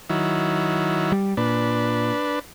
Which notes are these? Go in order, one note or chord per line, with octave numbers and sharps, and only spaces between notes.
D#3 F#3 E4
G3
A#2 D4 B4